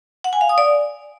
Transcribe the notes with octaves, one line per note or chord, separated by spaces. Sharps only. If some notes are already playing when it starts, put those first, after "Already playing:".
F#5
G#5
F5
D#6
D5